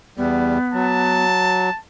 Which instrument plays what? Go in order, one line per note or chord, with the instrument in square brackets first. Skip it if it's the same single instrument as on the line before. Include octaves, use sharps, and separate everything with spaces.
[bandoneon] E2 G3 [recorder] B3
[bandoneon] F#3 [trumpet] A5